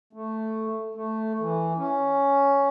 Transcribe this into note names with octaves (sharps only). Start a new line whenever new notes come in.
A3
A3
E3
C#4